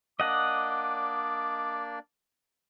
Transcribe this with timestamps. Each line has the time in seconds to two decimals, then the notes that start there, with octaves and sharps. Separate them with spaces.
0.20 A#3 D4 D5 D#5 F#5 D6